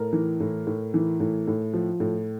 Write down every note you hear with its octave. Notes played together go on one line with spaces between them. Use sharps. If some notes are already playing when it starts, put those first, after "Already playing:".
Already playing: A2 A#4
E3
A2
A2
E3
A2
A2
F3
A2